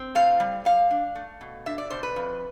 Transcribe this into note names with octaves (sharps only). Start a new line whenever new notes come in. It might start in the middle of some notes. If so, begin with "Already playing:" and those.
Already playing: C4
A2 F5
G3
G3 F5
D4
A3
B2
D4 E5
D5
B2 C5
B4
F2